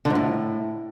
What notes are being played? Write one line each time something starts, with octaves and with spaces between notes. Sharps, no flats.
D3
G#2
A2